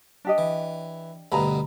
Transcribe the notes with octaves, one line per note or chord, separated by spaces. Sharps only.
D4 G4 D#5
E3
D2 G2 B2 A#5 B5